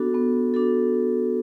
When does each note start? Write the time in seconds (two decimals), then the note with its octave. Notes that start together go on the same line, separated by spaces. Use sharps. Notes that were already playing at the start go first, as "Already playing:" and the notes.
Already playing: B3 D4 F#4 A4
0.14 B3
0.54 D4 F#4 A4